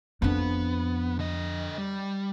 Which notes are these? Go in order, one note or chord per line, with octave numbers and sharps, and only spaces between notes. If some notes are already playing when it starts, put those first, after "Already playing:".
F2 B3 D4
D3 D#5
G3